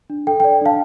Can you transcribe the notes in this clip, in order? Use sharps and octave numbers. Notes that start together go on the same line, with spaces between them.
D4
A4 G5
D5 G5
D4 F5 A5